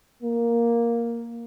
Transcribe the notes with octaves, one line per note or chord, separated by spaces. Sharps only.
A#3